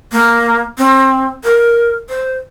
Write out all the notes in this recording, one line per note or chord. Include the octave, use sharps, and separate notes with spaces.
A#3
C4
A#4
C5